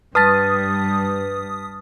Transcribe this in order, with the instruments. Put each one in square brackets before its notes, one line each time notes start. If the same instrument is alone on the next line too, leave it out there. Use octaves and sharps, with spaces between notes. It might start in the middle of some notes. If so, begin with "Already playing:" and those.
[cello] G2 G3 [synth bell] B4 A5 B6 [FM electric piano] D#6 [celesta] F6 A6